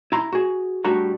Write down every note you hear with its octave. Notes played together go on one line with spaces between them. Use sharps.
E4 A#5 C6
F#4 G#4
A2 G3 D4 F#4 A#5